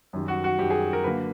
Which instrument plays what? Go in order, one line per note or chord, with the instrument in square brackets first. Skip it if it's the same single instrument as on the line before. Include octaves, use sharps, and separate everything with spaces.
[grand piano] F#2 D#3 G3
[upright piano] F#4
F#4
[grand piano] F#2 D#3 G3 [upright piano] G4
[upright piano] G#4
A#4
[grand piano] D3 F#3 A#3 [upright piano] B4